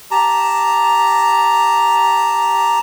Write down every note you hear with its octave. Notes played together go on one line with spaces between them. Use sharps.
G4 A5 A#5